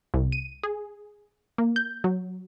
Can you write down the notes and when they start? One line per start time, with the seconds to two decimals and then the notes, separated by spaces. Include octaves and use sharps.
0.14 C2
0.32 D#7
0.63 G#4
1.58 A#3
1.76 G6
2.04 F#3